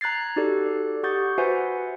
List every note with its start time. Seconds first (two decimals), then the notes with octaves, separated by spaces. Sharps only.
0.01 A#5 F#6 G#6 A6 C7
0.36 D#4 F#4 G4 A4 D5
1.03 G4 F#5 C#6 D#6 G6 A6
1.38 F#4 B4 C5 E5 F#5 G#5